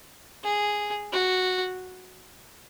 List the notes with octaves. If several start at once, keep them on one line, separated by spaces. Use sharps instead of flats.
G#4
F#4